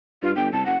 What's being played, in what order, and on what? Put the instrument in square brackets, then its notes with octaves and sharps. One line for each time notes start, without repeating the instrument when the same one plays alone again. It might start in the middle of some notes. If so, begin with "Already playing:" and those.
[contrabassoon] G2 [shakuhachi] F4
[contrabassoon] G1 [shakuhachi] G5
[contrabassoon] C2 [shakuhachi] A5
[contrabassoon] F#1 [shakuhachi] F#5